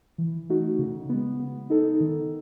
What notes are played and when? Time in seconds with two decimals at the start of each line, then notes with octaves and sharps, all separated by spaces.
0.18 E3
0.49 A3 D#4 F#4
0.79 C#3
1.09 G#3 B3
1.40 B3
1.70 D#4 A4
2.00 D#3